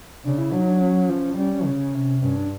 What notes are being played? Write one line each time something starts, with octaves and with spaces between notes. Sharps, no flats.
C#3 D4
E4
F#3 D4
D#4
D4
C#4
F3
G3 C#4
C#4
C#3
C3
G2 C#4
D4